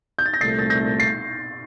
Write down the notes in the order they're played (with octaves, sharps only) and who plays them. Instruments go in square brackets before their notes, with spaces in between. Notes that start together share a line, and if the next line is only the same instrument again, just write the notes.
[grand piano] G6
A6
A#6
[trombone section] C2 A#2 A3 [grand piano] A6 C7
[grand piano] A6
G6 A#6
A6 C7